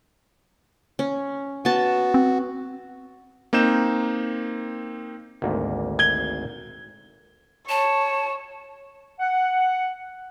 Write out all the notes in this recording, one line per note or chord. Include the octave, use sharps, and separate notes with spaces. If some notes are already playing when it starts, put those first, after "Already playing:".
C#4
B3 F#4 A5
C4
A#3 C4 D#4 G6 E7
G#1 D2 A#3
G#6 G7
C#5 A5
F#5